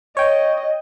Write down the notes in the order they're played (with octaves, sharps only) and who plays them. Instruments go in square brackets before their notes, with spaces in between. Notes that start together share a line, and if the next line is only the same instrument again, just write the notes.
[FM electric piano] C#5 G5 [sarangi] D#5